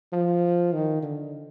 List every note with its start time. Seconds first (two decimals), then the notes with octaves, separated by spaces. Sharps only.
0.12 F3
0.73 D#3
1.02 D3